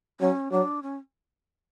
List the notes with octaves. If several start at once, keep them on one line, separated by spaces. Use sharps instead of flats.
F#3 C#4
F#3 D4
C#4